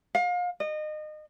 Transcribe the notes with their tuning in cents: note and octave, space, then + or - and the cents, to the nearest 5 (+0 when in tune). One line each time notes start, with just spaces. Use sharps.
F5 +35
D#5 -30